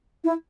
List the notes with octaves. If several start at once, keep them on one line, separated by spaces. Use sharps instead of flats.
E4